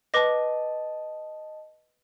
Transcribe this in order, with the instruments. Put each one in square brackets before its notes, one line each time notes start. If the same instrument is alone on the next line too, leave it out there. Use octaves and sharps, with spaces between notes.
[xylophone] B4 D6 A#6 [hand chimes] D#5 A5